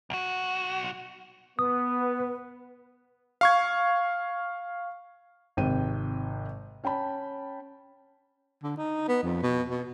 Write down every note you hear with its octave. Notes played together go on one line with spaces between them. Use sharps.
B1 F#4
B3 B4 D#6
F5 C#6 G#6
G#1 C3 G5 D#7
C#4 G5 A5 B5
D3
D#4
B3
F2
B2
B2